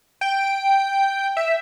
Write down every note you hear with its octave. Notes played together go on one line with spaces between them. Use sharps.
G5
E5